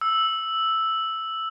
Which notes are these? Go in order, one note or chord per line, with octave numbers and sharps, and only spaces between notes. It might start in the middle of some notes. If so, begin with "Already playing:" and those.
E6